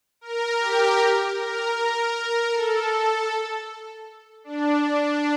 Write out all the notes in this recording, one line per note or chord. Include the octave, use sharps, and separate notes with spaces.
A#4
G4
A#4
A#4
A4
D4